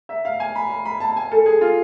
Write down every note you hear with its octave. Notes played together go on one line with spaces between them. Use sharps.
E5
F5
G#5
B5
B5
B5
A5
G#5
A4
G#4
F4